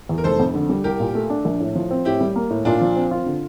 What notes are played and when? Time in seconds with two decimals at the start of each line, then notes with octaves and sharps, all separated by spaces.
0.09 E2
0.18 A#4
0.24 F1 A4 C5
0.40 F2
0.55 D3
0.69 G3
0.84 C2 G4 A#4
1.00 A#2
1.15 A3
1.30 D4
1.45 A#1
1.60 A2
1.75 F3
1.91 C4
2.05 A2 E4 G4
2.21 G3
2.36 A#3
2.50 A2
2.65 A#2 D4 F4
2.81 F3
2.96 C4
3.11 F4
3.26 D3